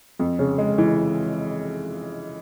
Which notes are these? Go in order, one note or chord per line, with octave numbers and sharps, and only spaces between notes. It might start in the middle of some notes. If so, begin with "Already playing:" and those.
F2
C#3
G#3
E3